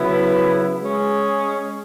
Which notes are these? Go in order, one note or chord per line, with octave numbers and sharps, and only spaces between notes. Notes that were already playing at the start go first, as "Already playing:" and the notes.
Already playing: C#3 F#3 B3 E4
G#3 C#4 G#4